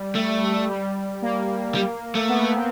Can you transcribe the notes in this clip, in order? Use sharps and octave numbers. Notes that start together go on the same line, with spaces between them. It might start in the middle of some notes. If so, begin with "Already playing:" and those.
Already playing: G3
A3
G3
A#3
G3
A3
B3
C4